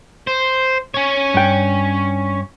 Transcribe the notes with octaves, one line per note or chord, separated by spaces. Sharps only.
C5
C#4 C#5
G2 G5